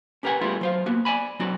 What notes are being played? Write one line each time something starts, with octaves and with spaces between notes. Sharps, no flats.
C#4 G4 A#4 B4 F#5 G#5
G3 A3 B3 E4 F4 G#4
F#3 C5 F5
A#3 B3 F#4
D5 E5 G#5 B5
F#3 C4 D#4 F#4 D5